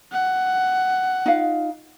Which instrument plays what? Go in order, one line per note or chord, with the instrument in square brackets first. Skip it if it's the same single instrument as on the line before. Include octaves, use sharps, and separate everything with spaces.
[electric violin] F#5
[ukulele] D#4 F4 F5